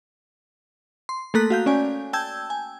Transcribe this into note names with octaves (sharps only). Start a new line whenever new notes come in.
C6
A3 A#3 A4 A#5 F#6 B6
F#4 F5 G6
C#4 D5 G#5
G5 A5 E6 G6 G#6
G#5